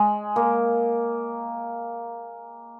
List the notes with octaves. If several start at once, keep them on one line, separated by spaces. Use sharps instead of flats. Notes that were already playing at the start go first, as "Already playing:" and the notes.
Already playing: G#3
A#3